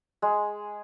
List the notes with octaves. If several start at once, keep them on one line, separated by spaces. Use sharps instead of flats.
G#3